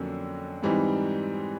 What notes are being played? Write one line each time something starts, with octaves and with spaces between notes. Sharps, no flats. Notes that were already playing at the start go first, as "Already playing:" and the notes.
Already playing: F2 D3 F#3 A#3 C#4
G#2 E3 G3 C4 D#4